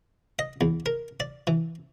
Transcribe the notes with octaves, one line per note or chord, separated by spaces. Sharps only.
D#5
E2
A#4
D5
E3